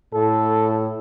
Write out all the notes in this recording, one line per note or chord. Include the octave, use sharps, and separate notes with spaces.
A2 A4